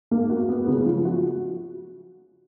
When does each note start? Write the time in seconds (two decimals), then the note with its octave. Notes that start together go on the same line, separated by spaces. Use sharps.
0.11 A#3
0.30 F#4
0.49 B3
0.67 C#3
0.86 F3
1.05 F#4